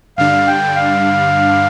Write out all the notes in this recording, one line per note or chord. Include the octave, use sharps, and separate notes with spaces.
G2 D3 G3 D4 F5
G5
F5